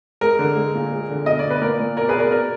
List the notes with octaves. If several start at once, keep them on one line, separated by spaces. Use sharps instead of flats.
G#3 A#4
D3
G#3
A#2
G#3
D3
B2 D#5
B2 D5
B4
A#2 A#4 D5
A#2
B2 A#4 D5
G#4 B4
B2
A#4 D5
B2 A#4 D5